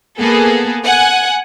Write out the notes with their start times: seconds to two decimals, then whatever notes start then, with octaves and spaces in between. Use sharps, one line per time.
0.18 A#3 B3 G#4 A4
0.84 F#5 G#5